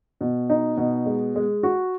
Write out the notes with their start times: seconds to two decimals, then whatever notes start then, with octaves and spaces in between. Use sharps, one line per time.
0.21 B2
0.50 D#4
0.77 B2
1.06 G#3
1.36 G#3
1.63 F#4